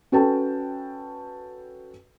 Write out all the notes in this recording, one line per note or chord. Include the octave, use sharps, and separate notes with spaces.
C#4 F#4 A4 B4 G5 A5